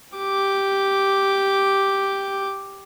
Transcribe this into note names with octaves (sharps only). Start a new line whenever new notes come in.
G4 D6